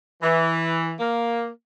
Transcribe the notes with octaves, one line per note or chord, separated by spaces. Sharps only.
E3
A#3